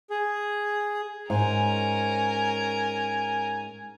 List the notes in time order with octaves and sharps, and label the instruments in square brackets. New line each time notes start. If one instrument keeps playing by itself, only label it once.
[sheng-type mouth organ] G#4
[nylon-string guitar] G#2 [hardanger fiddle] C#4 A#4 [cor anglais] G#5